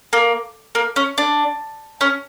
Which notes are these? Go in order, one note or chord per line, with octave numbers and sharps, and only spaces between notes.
A#3
A#3
C#4
D4
C#4